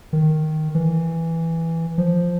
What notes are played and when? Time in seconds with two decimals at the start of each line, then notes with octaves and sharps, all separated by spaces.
0.13 D#3
0.75 E3
1.98 F3